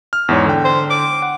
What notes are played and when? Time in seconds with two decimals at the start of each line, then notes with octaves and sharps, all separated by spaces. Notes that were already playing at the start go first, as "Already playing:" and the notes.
0.13 F6
0.29 E2 G#2 C#5
0.46 D3 G5
0.65 C5
0.90 D6
1.22 F#5